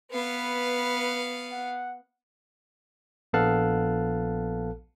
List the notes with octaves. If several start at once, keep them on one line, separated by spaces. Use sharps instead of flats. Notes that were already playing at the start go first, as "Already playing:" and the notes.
B3 B4 F5
F#5
A#1 B3 A4 F5 A5 F#6